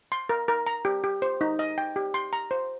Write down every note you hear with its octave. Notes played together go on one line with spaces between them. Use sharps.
C6
A#4
A#4
A#5
G4
G4
C5
D#4
D#5
G5
G4
C6
A#5
C5